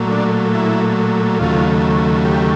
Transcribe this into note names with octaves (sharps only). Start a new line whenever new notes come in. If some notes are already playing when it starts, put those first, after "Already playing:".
Already playing: A#2 F#3 A3
D4
E4
D#2 C#3 F#3 A3 F4
G4